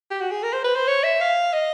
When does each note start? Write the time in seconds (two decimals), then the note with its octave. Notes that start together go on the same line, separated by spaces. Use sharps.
0.11 G4
0.21 F#4
0.31 G#4
0.43 A#4
0.53 C5
0.64 B4
0.76 C5
0.88 C#5
1.04 E5
1.21 F5
1.53 D#5